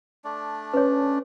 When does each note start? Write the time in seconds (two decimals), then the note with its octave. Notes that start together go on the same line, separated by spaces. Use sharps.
0.24 A3 D4 D5
0.74 C#4 B4 C#5